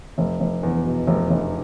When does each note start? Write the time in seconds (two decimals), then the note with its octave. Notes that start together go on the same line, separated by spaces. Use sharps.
0.18 F1
0.40 F1
0.63 E2
0.86 B2
1.07 F1
1.30 F1